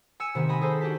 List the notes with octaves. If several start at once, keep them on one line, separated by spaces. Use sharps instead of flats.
G#5 E6 C#7 E7
C3 D#3 B3 G#5
D#5 G#5 B5
G#4 A4 C5 A5
D4 F#4 G4 A5 B6